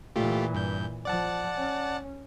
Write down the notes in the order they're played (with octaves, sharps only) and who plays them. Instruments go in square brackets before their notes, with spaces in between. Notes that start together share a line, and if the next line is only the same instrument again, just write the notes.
[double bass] A#2 E3 [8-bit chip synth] A3 F4 G4
[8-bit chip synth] G2 G6
[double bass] F3 [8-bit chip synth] D5 F#5 A5
[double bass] C#4